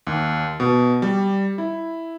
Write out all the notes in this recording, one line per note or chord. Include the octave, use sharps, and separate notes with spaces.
D#2
B2
G3
E4